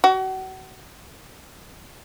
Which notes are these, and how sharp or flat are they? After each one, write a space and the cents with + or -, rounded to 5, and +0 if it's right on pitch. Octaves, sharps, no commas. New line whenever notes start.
F#4 +35